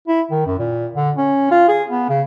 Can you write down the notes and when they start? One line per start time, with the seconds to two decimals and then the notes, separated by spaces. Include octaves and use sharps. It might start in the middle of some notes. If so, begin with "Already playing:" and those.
0.08 E4
0.31 D#3
0.46 F#2
0.59 A#2
0.95 D3
1.17 C#4
1.51 F4
1.68 G#4
1.89 B3
2.09 C#3